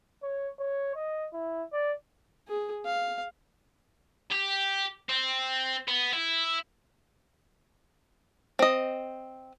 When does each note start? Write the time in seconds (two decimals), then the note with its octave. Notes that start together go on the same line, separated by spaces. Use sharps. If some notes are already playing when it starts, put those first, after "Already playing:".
0.23 C#5
0.59 C#5
0.96 D#5
1.33 E4
1.73 D5
2.48 G#4
2.86 F5
4.32 G4
5.09 C4
5.88 B3
6.13 E4
8.59 C4 D#5